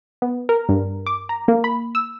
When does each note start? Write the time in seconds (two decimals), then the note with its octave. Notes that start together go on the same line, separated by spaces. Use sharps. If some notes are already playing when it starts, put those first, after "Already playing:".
0.22 B3
0.49 A#4
0.69 G2
1.06 D6
1.29 A#5
1.48 A#3
1.64 B5
1.95 E6